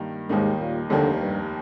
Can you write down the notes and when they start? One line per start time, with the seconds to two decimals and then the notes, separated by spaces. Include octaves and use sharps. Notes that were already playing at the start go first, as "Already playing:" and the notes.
Already playing: G2 D#3 A#3
0.29 D#2 G#2 D#3 G3 A#3 D#4
0.59 A#2
0.89 F1 D#2 D3 D#3 G3 A#3
1.19 G2